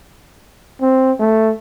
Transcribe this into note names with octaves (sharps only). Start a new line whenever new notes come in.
C4
A3